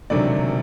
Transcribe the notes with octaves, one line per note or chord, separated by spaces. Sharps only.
E1 D2 C3 D#3 F#3 D5